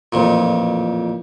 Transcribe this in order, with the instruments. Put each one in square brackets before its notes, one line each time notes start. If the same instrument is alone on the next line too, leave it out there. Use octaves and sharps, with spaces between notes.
[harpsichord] A1 F2 A#2